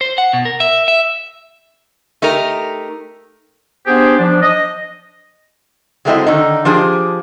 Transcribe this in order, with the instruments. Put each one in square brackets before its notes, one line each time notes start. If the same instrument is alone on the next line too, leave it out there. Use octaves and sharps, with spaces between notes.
[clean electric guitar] C5
F#5
B2
A#4
E5
E5
[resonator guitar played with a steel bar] A3 D#4 G4 A#4
[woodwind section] B3 D4 G4 G#4 C5
F3 D4
D#5
[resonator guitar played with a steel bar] F#3 G#3 A3 C4 E4 D#5
D3 D#3 D#4
F3 D4 G4 G#4 C5